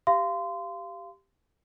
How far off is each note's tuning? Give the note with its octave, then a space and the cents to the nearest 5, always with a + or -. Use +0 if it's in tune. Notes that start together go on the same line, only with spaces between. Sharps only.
G4 +0 F5 -25 C6 -25